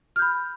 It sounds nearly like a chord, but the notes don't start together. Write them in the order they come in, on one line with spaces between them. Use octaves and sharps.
F6 G6 B5